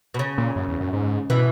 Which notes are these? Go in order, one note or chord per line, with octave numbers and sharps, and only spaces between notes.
B2
C#3
A#2
F#2
E2
F#2
G#2
B2 E3